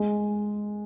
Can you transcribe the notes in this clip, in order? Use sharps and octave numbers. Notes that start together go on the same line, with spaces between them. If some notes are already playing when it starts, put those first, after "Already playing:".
Already playing: G#3